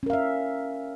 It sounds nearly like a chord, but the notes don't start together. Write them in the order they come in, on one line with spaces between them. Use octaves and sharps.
C#4 A#4 F5 E5